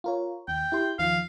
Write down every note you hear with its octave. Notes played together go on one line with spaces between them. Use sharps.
F4 A#4 C#5
D#2 G5
E4 G4 C6
D#2 D#3 F3 F5